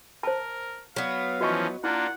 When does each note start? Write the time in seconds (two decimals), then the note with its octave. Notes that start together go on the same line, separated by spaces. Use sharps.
0.23 A#4 C5 A5
0.96 F#3 B3 F5
1.41 E3 F3 C#4 F#4 D#5 C#6
1.84 A#3 D4 E4 F4 F#5